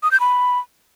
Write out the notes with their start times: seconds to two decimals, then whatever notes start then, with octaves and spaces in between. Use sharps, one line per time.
0.03 D#6
0.12 G6
0.20 B5